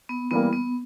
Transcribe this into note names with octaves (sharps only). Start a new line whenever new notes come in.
B3
E3 G3 A#3 B3
B3